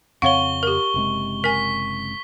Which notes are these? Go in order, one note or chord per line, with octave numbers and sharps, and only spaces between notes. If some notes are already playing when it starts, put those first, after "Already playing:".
F2 C#3 C4 C#5 F5 F#5 C#6 G7
G4 A#4
F#1 C3 G#3
A#4 G#5 B6